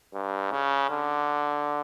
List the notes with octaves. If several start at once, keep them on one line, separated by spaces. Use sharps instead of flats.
G2
C#3
D3